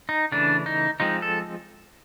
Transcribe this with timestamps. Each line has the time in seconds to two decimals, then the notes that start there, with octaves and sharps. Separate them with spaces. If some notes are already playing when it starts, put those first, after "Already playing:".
0.09 D#4
0.32 C#3 E3 A3 D4
0.66 D#4
1.00 F3 G#3 C4 D#4
1.22 A4